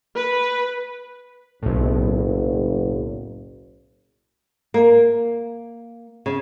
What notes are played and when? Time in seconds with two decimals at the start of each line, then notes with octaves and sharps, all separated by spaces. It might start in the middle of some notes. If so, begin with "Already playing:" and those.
0.17 B4
1.63 F#1 B1 A2
4.74 A#3
6.26 C#3